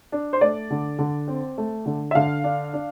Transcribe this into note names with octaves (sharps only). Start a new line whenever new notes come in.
D4
C5
A3 D5
D3
D3
C4
A3
D3
E5
D3 F5
D4
D4